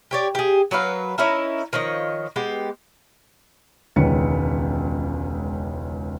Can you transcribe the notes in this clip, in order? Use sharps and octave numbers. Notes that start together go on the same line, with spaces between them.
G4 C#5 D5
G4 G#4
F#3 A#4 B4 F5
C#4 D#4 E4 A#4
D#3 F3 C#5 D#5
G#3 B3 G4
E1 C#2 D#3 C#4 B4 C#7